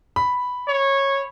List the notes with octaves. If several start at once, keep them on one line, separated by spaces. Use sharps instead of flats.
B5
C#5